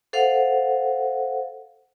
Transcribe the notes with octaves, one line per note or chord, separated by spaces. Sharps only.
A4 C5 F5 F#5